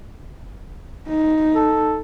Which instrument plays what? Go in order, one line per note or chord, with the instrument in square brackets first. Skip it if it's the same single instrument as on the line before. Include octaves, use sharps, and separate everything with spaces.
[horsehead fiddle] D#4
[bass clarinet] A4